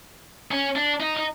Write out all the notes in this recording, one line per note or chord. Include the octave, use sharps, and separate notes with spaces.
C#4
D4
D#4
D#4